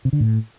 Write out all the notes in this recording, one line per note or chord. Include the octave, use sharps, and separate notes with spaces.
C3
D3
A2